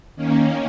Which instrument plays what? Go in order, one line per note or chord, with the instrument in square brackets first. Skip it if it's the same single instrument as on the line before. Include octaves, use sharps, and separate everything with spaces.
[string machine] D#3 A#3 C#4